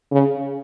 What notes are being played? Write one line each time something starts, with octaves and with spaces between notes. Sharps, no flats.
C#3